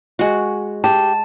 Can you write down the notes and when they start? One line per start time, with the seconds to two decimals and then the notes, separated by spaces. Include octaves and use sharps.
0.19 G#3 F#4
0.84 G4 A5